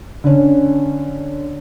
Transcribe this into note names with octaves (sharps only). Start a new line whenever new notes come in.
D3 C#4